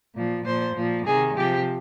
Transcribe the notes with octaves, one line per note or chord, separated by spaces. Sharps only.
A#2 F3
A#2 F3 C5
A#2 F3
C3 D#3 G#4
C3 F3 G4